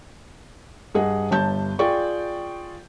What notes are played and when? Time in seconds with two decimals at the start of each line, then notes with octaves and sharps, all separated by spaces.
0.95 G2 G#4 D#5 F#5
1.31 G1 G2 A5 G6
1.79 F4 G#4 D5 G5 C#6